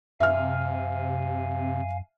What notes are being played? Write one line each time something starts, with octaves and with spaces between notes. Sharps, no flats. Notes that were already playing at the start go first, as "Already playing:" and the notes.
F#2 C3 E5 F5 G#5 F6